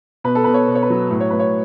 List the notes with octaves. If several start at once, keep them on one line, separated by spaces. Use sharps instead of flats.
B2 B4
A4
B2 B4
C#5
B2
C#5
B4
F#3
A2
C#5
A2 B4
C#5